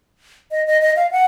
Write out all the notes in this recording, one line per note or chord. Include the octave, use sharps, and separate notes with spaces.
D#5
D#5
D#5
F5
F#5